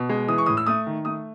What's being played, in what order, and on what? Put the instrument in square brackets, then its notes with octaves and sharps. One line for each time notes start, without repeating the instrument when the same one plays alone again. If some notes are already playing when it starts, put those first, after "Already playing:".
Already playing: [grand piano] B2
G#3
E3 D#6
C#6
A2 D#6
E6
A3 D#6
D#3
A3 D#6